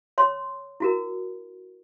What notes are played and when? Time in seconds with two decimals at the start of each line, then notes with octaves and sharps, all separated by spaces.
0.18 C#5 C6
0.80 E4 F#4 A#4